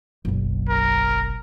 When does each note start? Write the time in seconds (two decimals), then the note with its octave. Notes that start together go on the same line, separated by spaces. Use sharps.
0.25 F#1 B1
0.69 A#4